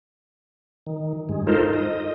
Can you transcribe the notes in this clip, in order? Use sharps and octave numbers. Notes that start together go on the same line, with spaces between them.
D#3
G2 G#3
D#4 F4 A4 A#4 C5
D#5